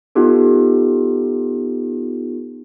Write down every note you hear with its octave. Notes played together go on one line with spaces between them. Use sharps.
B3 D#4 F4 G4 A4